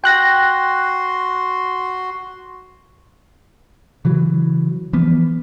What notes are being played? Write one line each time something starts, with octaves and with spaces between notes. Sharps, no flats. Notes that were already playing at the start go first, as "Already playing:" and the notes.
F#4 G5 C6 F#6 A#6
C#3 E3 F#3
E3 F3 B3